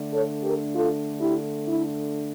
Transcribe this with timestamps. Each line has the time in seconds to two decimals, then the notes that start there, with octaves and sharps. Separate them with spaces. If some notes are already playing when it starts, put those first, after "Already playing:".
Already playing: D3 A3 D4
0.13 A4 C#5
0.43 G4 A#4
0.74 F4 A4
1.19 E4 G4
1.65 E4